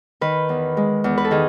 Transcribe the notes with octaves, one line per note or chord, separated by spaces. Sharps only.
D#3 B4
E2
G#3
E2
B4
A4
D#3 G#4